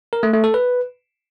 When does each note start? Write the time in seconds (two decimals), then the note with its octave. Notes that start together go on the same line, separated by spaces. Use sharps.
0.13 A#4
0.23 A3
0.33 A3
0.44 A4
0.54 B4